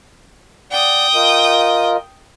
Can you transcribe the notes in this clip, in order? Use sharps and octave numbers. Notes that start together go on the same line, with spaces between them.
D5 F#5 G5 D#6
F4 A#4 D#5